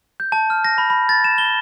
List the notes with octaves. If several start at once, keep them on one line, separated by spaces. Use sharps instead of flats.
G6
A5
F6
A#6
B5
B5
A6
E7
G7